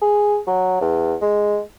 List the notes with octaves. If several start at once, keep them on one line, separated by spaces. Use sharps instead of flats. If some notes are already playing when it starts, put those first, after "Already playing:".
G#4
F#3
E2
G#3